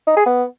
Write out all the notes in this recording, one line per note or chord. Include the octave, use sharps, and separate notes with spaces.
D#4
G#4
B3